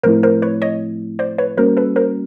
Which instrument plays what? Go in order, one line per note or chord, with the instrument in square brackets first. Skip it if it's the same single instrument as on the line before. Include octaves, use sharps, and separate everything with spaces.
[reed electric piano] A2 F3 A3 C4 E4 [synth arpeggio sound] A#4 C5
[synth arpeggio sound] A#4 C5
B4 C#5
C#5 D#5
C5 D5
B4 C#5
[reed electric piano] G3 A#3 C#4 F#4 [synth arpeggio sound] A#4 C5
[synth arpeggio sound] A4 B4
A#4 C5